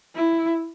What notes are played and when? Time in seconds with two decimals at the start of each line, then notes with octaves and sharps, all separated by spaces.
0.15 E4